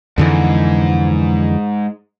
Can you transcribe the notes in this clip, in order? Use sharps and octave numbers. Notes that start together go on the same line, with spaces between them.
F2 G#2 D3 E3